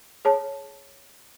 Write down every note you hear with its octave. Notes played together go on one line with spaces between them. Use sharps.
G#4 C#5 A5